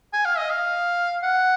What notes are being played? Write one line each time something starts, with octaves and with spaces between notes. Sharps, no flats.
G#5
F5
D#5
F5
F#5